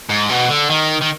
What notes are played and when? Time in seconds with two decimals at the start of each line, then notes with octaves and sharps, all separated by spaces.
0.09 G#2
0.29 B2
0.49 D3
0.70 D#3
1.02 D#3